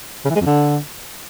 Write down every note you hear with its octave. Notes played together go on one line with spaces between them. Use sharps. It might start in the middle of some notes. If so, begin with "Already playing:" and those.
C#3
E3
G#3
F2
D3